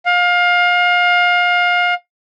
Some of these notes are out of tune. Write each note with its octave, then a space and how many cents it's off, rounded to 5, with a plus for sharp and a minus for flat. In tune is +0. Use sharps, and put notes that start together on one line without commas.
F5 +25